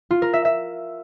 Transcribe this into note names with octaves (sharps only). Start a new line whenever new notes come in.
F4
A#4
E5
E5